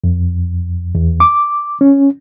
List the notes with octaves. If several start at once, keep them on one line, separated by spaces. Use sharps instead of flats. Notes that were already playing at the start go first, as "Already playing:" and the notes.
F2
E2
D6
C#4